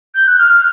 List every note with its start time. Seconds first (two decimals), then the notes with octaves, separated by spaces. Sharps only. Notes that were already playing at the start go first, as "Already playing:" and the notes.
0.15 G6
0.27 F#6
0.39 F6
0.50 F6